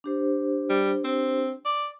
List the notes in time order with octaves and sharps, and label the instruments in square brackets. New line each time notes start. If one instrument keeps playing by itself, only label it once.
[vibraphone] D4 G4 C5
[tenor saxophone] G3
C4
D5